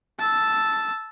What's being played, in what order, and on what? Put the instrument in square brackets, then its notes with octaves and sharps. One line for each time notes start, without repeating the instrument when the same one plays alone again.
[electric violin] A5 E6